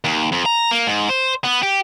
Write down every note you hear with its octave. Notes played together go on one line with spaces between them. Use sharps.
D#2
F2
A#5
A#3
G#2
C5
B3
G4